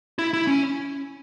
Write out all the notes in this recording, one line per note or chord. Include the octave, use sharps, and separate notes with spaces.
E4
E4
C#4